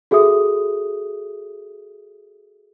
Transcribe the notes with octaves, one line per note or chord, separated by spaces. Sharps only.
F#4 G#4 A4 E5 D#6